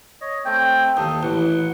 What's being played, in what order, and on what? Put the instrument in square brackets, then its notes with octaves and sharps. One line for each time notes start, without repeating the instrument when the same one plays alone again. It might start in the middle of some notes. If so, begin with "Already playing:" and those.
[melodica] C#5 D#5
A3 C4 G5
[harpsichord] D#2 [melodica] A4 D#6
[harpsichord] A1 [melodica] F#5